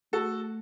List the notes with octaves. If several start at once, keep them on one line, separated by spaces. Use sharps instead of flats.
A3 F#4 A4